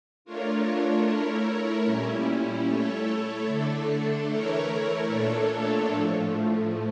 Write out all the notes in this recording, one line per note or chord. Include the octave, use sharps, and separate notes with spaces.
A3 D4 F4 A#4 C#5
A3 E4 A#4 C#5
A#2 G3 C#4 E4
A3 E4 A4 C#5
D3 A3 D4 A4
E3 A3 E4 A#4 C#5
A#2 A3 D4 A4 C#5
A2 F3 A3